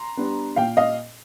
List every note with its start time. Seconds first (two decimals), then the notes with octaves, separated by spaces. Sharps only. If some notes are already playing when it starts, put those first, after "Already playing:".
Already playing: A#5 C6
0.17 G3 B3 D4
0.56 A#2 F5 G5
0.77 D#5 F5